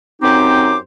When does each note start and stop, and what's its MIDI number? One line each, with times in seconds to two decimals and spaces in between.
0.22 0.77 42
0.22 0.77 60
0.22 0.77 63
0.22 0.77 67
0.22 0.77 72
0.22 0.77 86